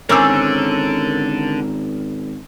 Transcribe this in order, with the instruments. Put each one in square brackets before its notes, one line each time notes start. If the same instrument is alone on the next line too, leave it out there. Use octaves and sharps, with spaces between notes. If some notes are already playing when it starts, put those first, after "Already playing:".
[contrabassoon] G#1 [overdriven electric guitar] D3 [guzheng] C#4 C5 [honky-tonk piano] A#4 D6 E6